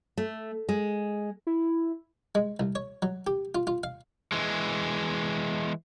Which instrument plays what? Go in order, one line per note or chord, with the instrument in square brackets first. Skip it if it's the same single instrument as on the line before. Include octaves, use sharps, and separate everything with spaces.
[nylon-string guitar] A3
G#3
[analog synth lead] E4
[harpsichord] G#3
C2
C#5
F#3
G4
F4
F4
F5
[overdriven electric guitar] E3 G#3